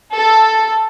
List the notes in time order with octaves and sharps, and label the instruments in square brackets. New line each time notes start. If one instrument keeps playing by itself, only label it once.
[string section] A4